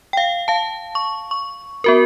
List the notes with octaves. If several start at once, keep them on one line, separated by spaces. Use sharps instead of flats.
F5 G5
F5 A5
C#6
C#6
B3 F#4 A#4